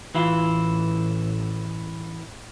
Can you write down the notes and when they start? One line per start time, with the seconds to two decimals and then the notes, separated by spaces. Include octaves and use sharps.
0.15 A1 E3 E4 F4